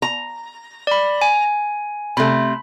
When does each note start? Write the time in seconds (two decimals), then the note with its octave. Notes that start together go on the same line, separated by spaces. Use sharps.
0.02 A#5
0.87 D5 B5
1.22 G#5
2.17 C3 A3 B5